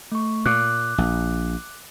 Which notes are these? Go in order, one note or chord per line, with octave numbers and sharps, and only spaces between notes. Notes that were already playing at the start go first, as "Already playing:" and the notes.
A3 C#6
A#2 D6 F#6
A#1